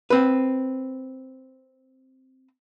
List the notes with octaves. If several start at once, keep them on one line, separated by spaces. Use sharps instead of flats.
C4 B4